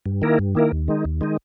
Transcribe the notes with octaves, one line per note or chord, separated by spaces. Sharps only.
G2
D#3 A#3 E4 A#4
G2
D#3 A#3 E4 A#4
D#2
D#3 G#3 D#4
D#2
D#3 G#3 D#4